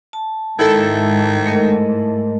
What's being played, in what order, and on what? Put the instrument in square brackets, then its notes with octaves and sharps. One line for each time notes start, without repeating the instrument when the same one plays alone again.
[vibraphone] A5
[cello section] G#2 [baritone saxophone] D#3 [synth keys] E4 A4
[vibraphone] A3 A#4 D#5